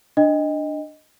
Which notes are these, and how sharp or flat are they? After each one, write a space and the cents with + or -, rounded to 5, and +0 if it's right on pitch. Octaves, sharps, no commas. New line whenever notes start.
D4 +10 D#5 +0 G5 +40